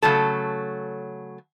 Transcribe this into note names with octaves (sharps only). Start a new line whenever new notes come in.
C#3 F#3 A3 A4